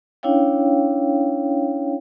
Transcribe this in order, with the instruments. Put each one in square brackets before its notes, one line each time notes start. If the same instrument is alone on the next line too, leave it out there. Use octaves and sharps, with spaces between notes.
[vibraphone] C#4 D4 E4 C#5 F5 G5